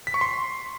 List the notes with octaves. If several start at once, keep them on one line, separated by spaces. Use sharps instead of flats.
B6
C#6
C6